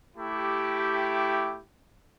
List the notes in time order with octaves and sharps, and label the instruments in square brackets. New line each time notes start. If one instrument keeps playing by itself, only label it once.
[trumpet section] A3 E4 G4